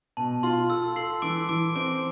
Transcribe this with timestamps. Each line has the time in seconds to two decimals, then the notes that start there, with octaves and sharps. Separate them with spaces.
0.17 B2 A5
0.43 F4 C6
0.70 A4 E6
0.96 A4 C6 C7
1.22 E3 D6 D7
1.49 E3 D6 D7
1.75 C4 D6 D7